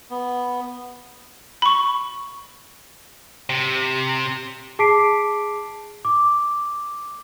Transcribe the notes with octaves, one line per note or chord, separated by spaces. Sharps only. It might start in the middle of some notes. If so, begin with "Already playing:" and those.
B3
B5 C#6
C3
G#4 A5 D6 B6 C7 D7
D6